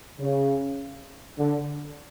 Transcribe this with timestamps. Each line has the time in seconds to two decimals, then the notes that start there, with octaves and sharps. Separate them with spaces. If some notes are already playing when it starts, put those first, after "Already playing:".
0.19 C#3
1.38 D3